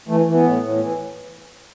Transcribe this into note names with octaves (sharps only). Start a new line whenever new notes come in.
E3 A3
E3
B3
A2
A2
E3